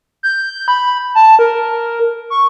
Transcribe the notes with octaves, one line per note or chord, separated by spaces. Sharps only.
G6
B5
A5
A#4
C#6